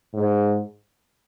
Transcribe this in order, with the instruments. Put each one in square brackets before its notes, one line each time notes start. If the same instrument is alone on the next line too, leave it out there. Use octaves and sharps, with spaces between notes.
[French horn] G#2